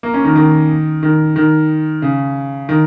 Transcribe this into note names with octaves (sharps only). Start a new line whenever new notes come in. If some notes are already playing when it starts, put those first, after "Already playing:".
A#3
C#4
D#3
D#3
D#3
D#3
C#3
D#3